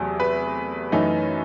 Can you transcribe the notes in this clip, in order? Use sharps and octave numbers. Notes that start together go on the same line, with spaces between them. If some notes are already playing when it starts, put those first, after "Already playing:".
Already playing: E2 C3 F#3 A3
B4
F#2 E3 A3 D#4